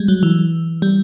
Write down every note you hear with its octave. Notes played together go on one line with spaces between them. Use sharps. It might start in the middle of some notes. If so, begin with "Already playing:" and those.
Already playing: G3 G#3
F#3
E3
G3